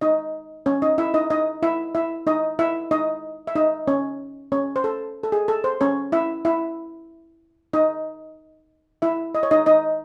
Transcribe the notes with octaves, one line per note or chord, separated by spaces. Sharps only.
D#4 D#5
C#4 C#5
D#4 D#5
E4 E5
D#4 D#5
D#4 D#5
E4 E5
E4 E5
D#4 D#5
E4 E5
D#4 D#5
E5
D#4 D#5
C#4 C#5
C#4 C#5
C5
A4
A4
G#4
A4
C5
C#4 C#5
E4 E5
E4 E5
D#4 D#5
E4 E5
D#5
C#5
D#4 D#5
D#4 D#5